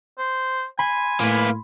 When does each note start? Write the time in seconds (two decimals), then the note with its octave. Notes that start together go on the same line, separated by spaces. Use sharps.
0.18 C5
0.79 G#5 B5 C6
1.20 A2 A#3 B4